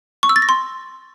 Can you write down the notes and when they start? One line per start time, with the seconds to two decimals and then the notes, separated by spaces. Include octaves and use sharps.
0.23 C#6
0.29 E6
0.36 A6
0.42 A#6
0.49 C6